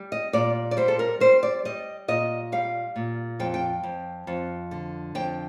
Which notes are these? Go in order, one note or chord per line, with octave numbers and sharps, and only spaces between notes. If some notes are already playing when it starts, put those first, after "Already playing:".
Already playing: G3
D#5
A#2 D5
D5
G3 C5
A4
A#4
G3 C5
D5
G3 D#5
A#2 D#5
G3 F5
A#2
F2 G5
G5
F2
F2
D3
F2 G5